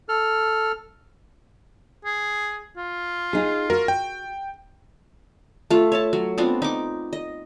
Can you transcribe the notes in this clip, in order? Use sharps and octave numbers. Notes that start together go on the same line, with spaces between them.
A4 F6
G#4
F4
D#4 G#4
F#4 A#4
G5
A3 F4
C#5 E5 A5
F#3
B3 C4 D4 F4
D#4 D6
D#5